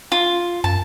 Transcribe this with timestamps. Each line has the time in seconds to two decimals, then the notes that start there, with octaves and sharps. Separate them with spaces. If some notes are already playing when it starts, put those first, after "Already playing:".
0.12 F4
0.64 F#2 A5